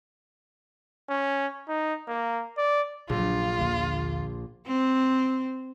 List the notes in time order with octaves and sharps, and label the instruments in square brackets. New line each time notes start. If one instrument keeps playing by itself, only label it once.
[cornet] C#4
D#4
A#3
D5
[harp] A#1 [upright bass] C#3 F#3 [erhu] F4
[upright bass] D#2 D3
[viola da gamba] C4